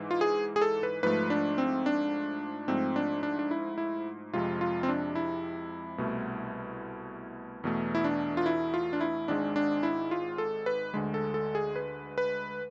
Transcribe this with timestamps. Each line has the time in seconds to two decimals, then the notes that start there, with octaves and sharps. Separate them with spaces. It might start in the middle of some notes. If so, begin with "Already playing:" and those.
Already playing: G#2 E3 G#3
0.11 F4
0.21 G#4
0.56 G#4
0.62 A4
0.83 B4
1.03 G#2 F3 A3 B4
1.30 D4
1.58 C4
1.86 D4
2.68 G#2 F3 A3 C4
2.96 D4
3.23 D4
3.39 D4
3.51 E4
3.78 E4
4.34 F2 C3 G#3 F4
4.61 F4
4.83 C4
4.89 D4
5.15 E4
5.98 C2 B2 A3
7.64 E2 B2 A3
7.95 E4
8.04 D4
8.37 F4
8.46 E4
8.74 F4
8.93 D4
9.01 E4
9.28 G#1 G#2 G#3 D4
9.56 D4
9.83 E4
10.11 F4
10.38 A4
10.66 B4
10.94 D2 D3 G#3
11.14 A4
11.34 A4
11.55 G#4
11.76 B4
12.18 B4